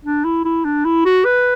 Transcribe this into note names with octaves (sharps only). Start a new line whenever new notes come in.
D4
E4
E4
D4
E4
F#4
B4